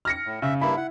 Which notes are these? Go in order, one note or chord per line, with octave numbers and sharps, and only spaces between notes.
F6 A#6 C#7
A2
C#3 E5
G2 A#3 E4 B5
E4 F#5